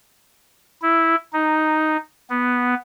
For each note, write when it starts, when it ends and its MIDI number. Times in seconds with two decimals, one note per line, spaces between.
0.82 1.15 64
1.33 1.97 63
2.30 2.74 59